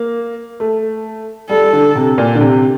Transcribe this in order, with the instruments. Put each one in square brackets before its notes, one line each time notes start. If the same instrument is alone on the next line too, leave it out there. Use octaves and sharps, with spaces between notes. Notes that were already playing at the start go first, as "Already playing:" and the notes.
Already playing: [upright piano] A#3
A3
[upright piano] G3 [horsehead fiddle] A4
[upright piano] D3
C3
A#2
D3
C3